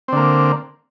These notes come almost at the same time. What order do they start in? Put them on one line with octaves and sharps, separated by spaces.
C4 D3 A#3